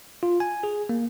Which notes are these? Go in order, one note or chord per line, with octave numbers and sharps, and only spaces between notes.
F4
G#5
G#4
A#3